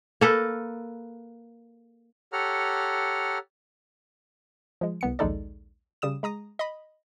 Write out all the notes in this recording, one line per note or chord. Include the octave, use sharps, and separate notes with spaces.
A#3 A4 B4
G4 A4 C#5 F#5 A#5 F6
F3 G#3
C2 B3 C#7
A#1 D#2 G#3 D#4 A4 D5
C#3 G3 D#6 E7
G#3 A#5 D#6 A#6
D#5 B5